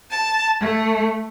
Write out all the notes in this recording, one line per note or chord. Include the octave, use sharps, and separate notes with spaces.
A5
A3